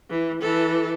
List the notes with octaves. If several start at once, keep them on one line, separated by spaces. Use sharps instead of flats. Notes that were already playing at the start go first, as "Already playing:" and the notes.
E3
E3 A4